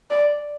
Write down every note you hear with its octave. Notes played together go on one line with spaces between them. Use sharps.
D5